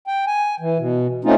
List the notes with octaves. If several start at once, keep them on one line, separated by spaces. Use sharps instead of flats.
G5
G#5
E3
B2
A3 C4 C#4 D#4 F4